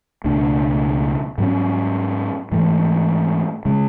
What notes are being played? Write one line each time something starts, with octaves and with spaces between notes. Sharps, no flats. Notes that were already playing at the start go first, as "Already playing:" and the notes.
C#2 B2 A3 D4
G#2 F#3 C#4
G#2 E3 A3
C#3 G#3